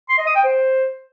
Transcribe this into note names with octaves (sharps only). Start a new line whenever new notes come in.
C6
D#5
D#6
G5
C5